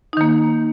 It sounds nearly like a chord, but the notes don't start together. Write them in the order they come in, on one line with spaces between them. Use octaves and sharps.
D#4 D#3 A#3